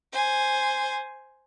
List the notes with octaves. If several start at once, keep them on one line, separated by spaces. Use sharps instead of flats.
C5 G#5